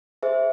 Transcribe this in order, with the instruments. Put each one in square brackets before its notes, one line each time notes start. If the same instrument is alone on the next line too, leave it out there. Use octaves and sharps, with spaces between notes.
[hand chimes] G#4 C5 E5